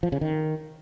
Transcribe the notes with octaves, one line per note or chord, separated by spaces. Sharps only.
F3
C#3
D#3